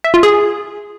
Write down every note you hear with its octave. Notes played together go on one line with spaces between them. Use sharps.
E5
F4
G#4